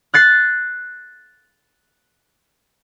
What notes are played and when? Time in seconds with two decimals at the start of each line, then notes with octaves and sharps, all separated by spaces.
0.14 F#6 A6 C7